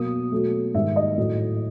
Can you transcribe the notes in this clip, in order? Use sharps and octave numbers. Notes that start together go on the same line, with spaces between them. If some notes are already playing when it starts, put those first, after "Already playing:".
Already playing: B2 F#3 A#3 D#6
B2 F#3 A3
G#2 D#3 G3 E5
D#5
A2 F#3 A3